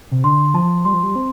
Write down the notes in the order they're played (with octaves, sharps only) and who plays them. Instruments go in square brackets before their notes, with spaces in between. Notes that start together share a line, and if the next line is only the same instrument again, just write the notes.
[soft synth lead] C3
[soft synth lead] D3 [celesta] C6
[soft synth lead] F3 [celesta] A5
[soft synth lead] G3 [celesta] C6
[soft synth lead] F3
G3
C4